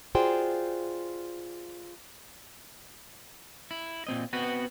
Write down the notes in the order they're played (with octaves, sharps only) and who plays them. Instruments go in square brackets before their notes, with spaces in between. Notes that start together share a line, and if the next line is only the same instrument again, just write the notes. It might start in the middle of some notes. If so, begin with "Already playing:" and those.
[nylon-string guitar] F4 F#4 G#4 C5 D5 G5
[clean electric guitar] E4
A#2 C4 D#5
B3 C4 F#4 B4